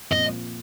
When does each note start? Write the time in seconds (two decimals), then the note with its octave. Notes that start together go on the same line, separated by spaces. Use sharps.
0.12 A#2 F3 C4 D#5